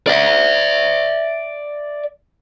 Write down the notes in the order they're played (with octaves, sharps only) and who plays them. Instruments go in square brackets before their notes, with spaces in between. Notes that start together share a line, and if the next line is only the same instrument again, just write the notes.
[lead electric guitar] D5 E5